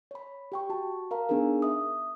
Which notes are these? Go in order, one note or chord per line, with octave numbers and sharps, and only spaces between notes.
C#5 B5
G4 G5 C#6
F#4 A5
A#4 F5 A#5
B3 D4 D#4 G#4 A#4
E5 D#6